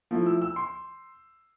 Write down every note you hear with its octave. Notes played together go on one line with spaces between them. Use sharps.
F3 A3 E4
E6
E6
C6